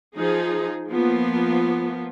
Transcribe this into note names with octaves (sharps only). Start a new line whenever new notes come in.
F3 D#4 G#4
F3 A#3 B3